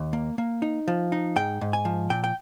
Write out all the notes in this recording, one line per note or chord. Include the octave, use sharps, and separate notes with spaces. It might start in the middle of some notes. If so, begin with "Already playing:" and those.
Already playing: D#2
A#3
A#3
D#4
F3
D#4
G#2 G5
G#2
G#5
F3
A#2 G5
G5